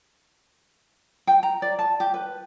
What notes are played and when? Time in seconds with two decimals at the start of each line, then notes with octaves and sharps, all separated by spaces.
1.27 G5
1.43 A#5
1.62 D5
1.79 A5
2.00 G4
2.14 B4